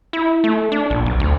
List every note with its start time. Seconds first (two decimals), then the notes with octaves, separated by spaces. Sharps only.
0.13 E4
0.44 A3
0.72 D4
0.90 A#1
1.06 B1
1.20 D2